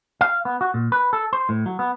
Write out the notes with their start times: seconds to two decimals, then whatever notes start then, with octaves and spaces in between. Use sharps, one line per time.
0.21 F5
0.45 B3
0.61 F#4
0.74 A#2
0.92 B4
1.13 A4
1.33 C5
1.49 A2
1.66 F#3
1.79 B3